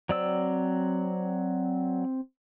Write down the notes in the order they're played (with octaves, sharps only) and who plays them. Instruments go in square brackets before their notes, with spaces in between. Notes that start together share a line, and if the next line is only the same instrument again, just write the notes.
[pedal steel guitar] F#3 D5 E6 [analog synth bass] C4